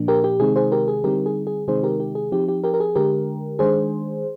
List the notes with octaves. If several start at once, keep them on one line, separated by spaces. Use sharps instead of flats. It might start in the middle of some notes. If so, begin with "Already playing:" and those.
Already playing: A#2 F3 A#3 D4
G4 A#4
G4
C3 D#3 G#3 C4 D#4 G#4
G#4 C5
G4 A#4
G#4
D3 G3 C4 D#4 G4 A#4
G#4
G#4
C3 D#3 G#3 C4 D#4 G#4 C5
G4 A#4
G4
G#4
F3 C4 D#4 G4
G4
G4 A#4
A#4
G#4
D3 G#3 D4 G4 A#4
D#3 G#3 D4 G#4 C5